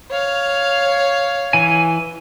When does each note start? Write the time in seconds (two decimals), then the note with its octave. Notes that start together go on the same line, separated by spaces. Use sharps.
0.11 C#5 F5
1.53 E3 G#5